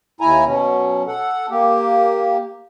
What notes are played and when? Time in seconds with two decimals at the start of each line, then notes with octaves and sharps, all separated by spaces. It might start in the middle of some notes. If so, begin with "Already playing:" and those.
0.21 D#2 E4 G#5 A#5
0.46 B2 F#3 C#4
1.07 A4 F#5
1.51 A#3 G4